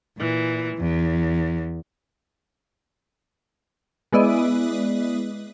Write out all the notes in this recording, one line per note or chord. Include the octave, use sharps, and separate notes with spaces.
A#2 E3
E2
G#3 B3 E4 D5 D#5